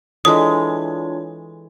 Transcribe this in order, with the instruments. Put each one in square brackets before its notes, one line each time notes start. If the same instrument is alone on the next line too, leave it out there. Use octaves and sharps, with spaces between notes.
[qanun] E3 G#3 [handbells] D4 F4 C#5 [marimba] A4 D#5 [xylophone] D#6